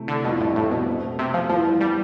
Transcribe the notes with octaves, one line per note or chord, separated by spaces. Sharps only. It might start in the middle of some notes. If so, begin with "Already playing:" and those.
Already playing: C3 E3 A3
D3
F2 B2 E3 G3 D4 F4
A2
A2
B2
B2 A3 C4
C3
F3
G2 E3 F3 B3
G3